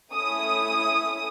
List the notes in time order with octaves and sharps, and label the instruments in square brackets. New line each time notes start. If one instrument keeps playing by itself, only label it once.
[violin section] A3 C#4 E4 D#6